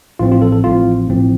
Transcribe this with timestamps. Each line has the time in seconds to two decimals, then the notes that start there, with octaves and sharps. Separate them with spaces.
0.19 A1 A2 F3 C4 F4
0.32 F4
0.42 A4
0.52 A4
0.64 A1 A2 F3 C4 F4
1.08 A1 A2 F3 C4